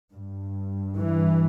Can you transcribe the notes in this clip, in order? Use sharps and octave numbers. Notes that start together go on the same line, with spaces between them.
G2
E3